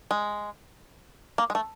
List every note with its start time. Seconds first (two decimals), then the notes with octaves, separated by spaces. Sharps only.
0.11 G#3
1.38 A#3
1.50 G#3
1.55 A3